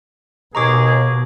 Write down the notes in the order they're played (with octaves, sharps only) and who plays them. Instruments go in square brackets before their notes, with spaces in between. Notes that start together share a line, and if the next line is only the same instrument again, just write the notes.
[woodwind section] D#2 G#4 [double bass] B2 [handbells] A#5 C#6 D6